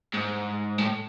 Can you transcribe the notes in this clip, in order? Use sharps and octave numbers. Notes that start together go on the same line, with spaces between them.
G#2
A2